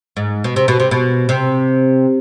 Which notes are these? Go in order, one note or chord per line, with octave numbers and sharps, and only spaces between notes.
G#2
B2
C3
B2
C3
B2
C3